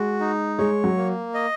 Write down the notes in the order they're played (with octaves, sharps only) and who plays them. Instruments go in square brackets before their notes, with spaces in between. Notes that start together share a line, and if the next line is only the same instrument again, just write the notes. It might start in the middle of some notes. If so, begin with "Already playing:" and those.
Already playing: [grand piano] G#3 [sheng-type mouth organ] F#4
[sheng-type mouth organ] D#4
[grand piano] G#3 [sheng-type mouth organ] C#5
[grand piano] F#3
[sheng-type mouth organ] A#3
D#5